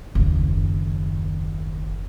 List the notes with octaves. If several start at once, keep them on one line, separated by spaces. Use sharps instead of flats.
F#1 D#2